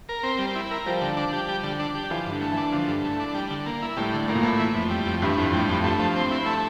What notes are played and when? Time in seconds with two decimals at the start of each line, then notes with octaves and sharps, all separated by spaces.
0.09 A#4
0.23 C4
0.39 G3
0.55 E4
0.71 A#4
0.86 F3 G3
1.01 D3
1.17 D4
1.33 G4
1.48 G3
1.63 D3
1.79 D4
1.95 G4
2.10 E3 F3
2.26 G2
2.31 D3
2.42 A3
2.51 E3
2.57 D4
2.72 D3 F3
2.88 G2
3.04 A3
3.20 D4
3.34 G3
3.50 D3
3.66 A#3
3.82 E4
3.97 A2 G3
4.13 D3
4.28 A2 A#3
4.35 A#2
4.43 A2 E4
4.60 E3
4.75 F2
4.90 G3
5.06 F2
5.22 G2 E3
5.37 F2 A2
5.53 A2 G3
5.68 F2 A2
5.84 G2 A3
5.99 F3
6.15 C4
6.31 E4
6.46 A3